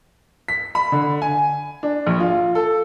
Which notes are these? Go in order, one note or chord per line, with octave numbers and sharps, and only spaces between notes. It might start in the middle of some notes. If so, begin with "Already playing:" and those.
B6
B5
D3
G#5
D4
A#1
F4
A4